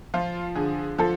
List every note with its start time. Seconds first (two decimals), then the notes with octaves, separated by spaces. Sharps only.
0.14 F3 F4
0.56 D3 G#4
0.98 F3 A4